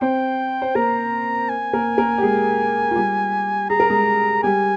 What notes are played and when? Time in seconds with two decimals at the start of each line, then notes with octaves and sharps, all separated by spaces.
0.01 C4 C5 G5
0.62 C5
0.75 A#3 A#4 A#5
1.49 G#5
1.73 A#3 A#4
1.98 A#3 A#4
2.18 G4
2.22 G#3 G#4
2.91 F4
2.96 G3 G4
3.70 G#4 A#5
3.80 A#4
3.90 G#3 G#4
4.43 G3 G4 G#5